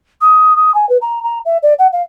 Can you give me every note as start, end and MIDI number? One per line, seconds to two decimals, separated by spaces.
0.21 0.56 87
0.56 0.74 87
0.74 0.88 80
0.89 0.97 71
1.01 1.22 82
1.23 1.39 82
1.45 1.57 76
1.63 1.73 74
1.79 1.87 78
1.92 2.02 77